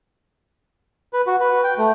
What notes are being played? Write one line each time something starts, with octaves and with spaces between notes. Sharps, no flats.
B4
F#4
B4
G5
A3